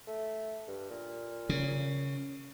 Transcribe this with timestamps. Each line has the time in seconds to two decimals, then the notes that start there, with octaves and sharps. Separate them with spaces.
0.07 A3
0.68 G2
0.91 A#2
1.49 C#3